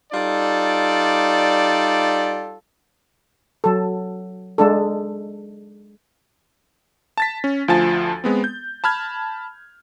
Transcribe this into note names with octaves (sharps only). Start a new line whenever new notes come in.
G3 D#4 F4 A4 D5
F#3 A4
G#3 D4 A4
A5 A6 B6
C#4
D2 F3 F4 G#5 A5 A6
G#3 B3 C4
G6
A5 B5 F6 G#6